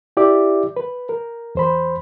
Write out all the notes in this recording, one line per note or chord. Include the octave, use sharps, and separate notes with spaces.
E4 G4 D5 E5 D6
B4
A#4
E2 C5 B5